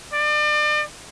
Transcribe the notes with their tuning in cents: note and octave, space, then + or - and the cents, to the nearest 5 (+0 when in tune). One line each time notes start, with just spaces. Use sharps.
D5 +35